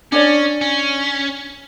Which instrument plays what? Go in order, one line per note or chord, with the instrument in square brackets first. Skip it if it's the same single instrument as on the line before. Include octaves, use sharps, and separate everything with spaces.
[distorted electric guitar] C#4 [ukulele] D4 C#5 D5
[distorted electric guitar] C#4